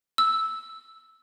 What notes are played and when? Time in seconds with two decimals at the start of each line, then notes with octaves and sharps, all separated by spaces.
0.18 E6